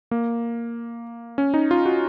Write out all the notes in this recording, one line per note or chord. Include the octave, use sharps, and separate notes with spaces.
A#3
C#4
D#4
F4
F#4